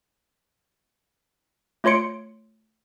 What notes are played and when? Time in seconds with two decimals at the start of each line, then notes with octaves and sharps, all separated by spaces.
1.84 A3 F4 C#5 C6 C#7 D7